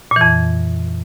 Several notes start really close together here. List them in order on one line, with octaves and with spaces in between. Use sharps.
A#2 E3 F2